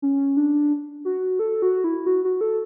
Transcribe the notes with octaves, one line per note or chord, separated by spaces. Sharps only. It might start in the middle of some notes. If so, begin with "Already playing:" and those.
C#4
D4
F#4
A4
F#4
E4
F#4
F#4
A4